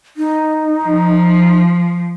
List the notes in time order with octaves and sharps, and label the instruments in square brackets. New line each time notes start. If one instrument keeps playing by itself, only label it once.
[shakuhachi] D#4
[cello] F3